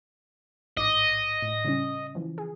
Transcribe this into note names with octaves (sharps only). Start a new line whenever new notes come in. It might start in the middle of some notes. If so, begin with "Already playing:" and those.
A1 G#2 D#5 D6
A2
C#3 G3 C#4
E3 F3
G#4